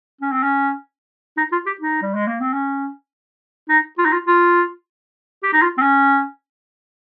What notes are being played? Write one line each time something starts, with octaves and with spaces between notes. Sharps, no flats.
C#4
C4
C#4
D#4
F4
G4
D#4
G3
G#3
A#3
C4
C#4
D#4
F4
D#4
F4
F4
G4
D#4
F4
C4
C#4